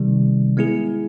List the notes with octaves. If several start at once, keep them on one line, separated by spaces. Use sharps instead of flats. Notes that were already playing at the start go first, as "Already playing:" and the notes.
Already playing: C3 D#3 G3
G#3 B3 E4 G#4